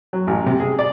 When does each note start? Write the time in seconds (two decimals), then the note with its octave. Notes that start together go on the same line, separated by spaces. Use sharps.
0.13 F#3
0.27 A1
0.46 C3
0.60 G#4
0.79 D5